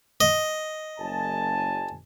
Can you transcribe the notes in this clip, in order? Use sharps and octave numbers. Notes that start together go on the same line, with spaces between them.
D#5
F#1 G#5 A5